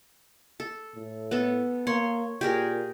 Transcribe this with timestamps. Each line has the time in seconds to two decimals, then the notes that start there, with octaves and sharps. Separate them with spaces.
0.60 A4
0.95 A2
1.31 B3 A4
1.87 A#3 C#5 C6
2.41 A#2 G4 G#4 A#4